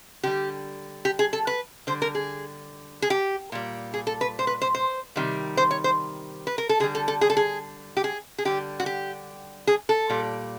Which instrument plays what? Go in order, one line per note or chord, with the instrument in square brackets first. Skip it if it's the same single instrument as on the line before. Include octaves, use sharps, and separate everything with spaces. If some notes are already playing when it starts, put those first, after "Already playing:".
[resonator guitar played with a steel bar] D3 G3 G4
G4
G#4
A4
B4
D3 G3 C5
A#4
G#4
G#4
G4
A#2 G3
G#4
A4
B4
C5
B4
C5
C5
C3 D#3 G3
C5
C#5
C5
B4
A#4
A4
D3 G#4
G3
A4
A4
G#4
A4
G#4
G4
G#4
G#4
D3 G3 G4
F#4
G4
G#4
A4
A#2 G3